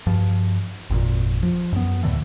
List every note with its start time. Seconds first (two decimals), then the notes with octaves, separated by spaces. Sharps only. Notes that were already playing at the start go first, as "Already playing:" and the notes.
0.07 G2 F3
0.90 G#1 F2 A#2
1.43 F3
1.72 F#2 B3
2.03 D2 A2 D3 E3